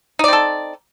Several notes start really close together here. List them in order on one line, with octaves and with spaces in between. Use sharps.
D#4 D5 C4 A4